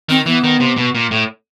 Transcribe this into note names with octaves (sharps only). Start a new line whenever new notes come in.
D#3 C4
E3 B3
D#3
C3
B2
A#2
A2